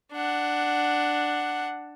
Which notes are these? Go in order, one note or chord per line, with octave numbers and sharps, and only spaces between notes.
D4 F#5